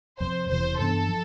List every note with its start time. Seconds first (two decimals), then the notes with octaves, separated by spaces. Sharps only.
0.20 F2 C3 F3 C4 C5
0.49 E1 E2 C3 E3 C5
0.79 G2 E3 B3 D4 A4
1.09 F3